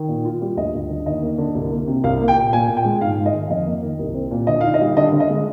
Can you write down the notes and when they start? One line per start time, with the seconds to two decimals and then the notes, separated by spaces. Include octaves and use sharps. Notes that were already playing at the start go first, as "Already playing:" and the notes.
Already playing: D#3
0.08 A#2
0.25 F4
0.41 G3
0.57 D2 D#5
0.73 D2
0.90 D3
1.06 D#2 D#5
1.22 A#3
1.38 D3
1.55 C2
1.71 A#3
1.87 C3
2.04 C2 F5
2.20 A#3
2.28 G5
2.36 A#2
2.52 A#2 G#5
2.68 A#2
2.77 G5
2.85 G#3
3.01 G#2 F5
3.18 G#2
3.26 D#5
3.33 D#3
3.50 F2 D#5
3.66 A#3
3.83 D#3
3.99 C2
4.14 C4
4.31 A#2
4.47 D3 D#5
4.61 D#4 F5
4.74 D#5
4.81 G3
4.97 D3 D#5
5.12 D3
5.20 D#5
5.29 G#3